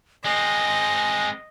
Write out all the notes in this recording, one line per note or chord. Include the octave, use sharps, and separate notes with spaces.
G#3 C4 D#5 G#5